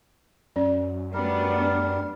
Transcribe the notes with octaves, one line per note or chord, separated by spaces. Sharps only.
F#2 C#4 D5
G3 A3 B3 D4 A#4